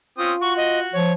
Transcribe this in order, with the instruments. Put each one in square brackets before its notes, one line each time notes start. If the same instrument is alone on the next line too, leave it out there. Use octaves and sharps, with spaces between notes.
[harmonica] C4 C#4 D#6 [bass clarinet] F4
[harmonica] F#4 [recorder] C#6
[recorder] D#5
[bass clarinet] F3 [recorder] C#5